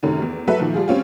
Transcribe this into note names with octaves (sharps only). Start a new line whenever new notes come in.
F#2 C3 D#3 A3 C#4
E2
F#3 A4 B4 E5
A#2 D#3 F3
G3 F4 G#4
G3 C4 C#4 F4